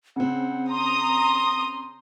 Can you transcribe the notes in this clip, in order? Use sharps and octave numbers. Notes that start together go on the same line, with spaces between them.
C#3 C4 F#5
A#5 C6 D#6